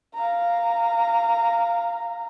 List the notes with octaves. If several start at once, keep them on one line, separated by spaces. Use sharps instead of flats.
F5 A#5